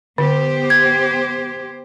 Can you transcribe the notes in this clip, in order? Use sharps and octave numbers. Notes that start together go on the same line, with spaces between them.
D3 B3 G4 C5
G#6